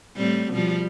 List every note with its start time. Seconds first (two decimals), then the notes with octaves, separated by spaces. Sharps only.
0.17 A2 G3 C4
0.52 B2 F3 G3